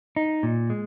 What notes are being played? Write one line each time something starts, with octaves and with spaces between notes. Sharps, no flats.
D#4
A#2
G#3